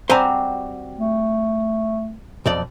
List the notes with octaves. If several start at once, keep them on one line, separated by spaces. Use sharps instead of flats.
G3 C4 F#4 C5 G#5 A#5
A3
B1 F2 D5